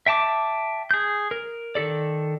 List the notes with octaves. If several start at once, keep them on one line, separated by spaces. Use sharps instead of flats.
E5 G5 A5 D6
G#4 G6
A#4
D#3 G4 A4 D5